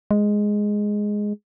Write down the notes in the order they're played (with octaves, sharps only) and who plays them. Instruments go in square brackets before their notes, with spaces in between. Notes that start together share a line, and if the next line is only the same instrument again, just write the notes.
[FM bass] G#3